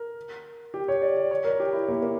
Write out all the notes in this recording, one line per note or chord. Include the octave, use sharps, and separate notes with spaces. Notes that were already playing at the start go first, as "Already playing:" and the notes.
Already playing: A#4
G4
C#5
D5
D5
C#5
A#4
G4
E4
A#3
A#3